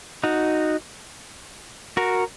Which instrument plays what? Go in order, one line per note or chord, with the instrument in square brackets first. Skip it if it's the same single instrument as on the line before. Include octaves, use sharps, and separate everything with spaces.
[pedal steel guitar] D#4 F#4
F#4 A#4